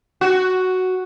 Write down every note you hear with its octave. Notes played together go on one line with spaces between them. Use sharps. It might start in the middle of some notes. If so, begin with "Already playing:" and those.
F#4